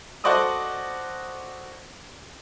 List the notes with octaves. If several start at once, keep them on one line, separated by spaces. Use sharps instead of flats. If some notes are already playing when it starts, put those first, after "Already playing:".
F#4 A4 C5 D5 D#5 D#6